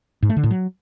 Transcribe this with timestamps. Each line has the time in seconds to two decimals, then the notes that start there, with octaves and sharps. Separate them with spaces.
0.22 G#2
0.29 A3
0.36 D3
0.43 A2
0.50 F#3